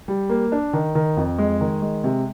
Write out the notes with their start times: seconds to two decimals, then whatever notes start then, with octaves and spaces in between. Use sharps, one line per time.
0.08 G3
0.29 A#3
0.52 D4
0.73 D#3
0.95 D#3
1.17 F2
1.38 G#3
1.61 D#3
1.82 G#3
2.04 C3